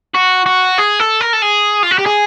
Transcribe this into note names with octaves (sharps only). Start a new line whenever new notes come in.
F#4
F#4
G#4
A4
A#4
A4
G#4
F4
F#4
G4
G#4